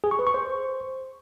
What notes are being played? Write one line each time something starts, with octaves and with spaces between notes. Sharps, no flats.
G#4
C#6
B4
C#6
C5